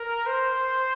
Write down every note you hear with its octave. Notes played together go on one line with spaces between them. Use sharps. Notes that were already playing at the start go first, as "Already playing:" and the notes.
Already playing: A#4
C5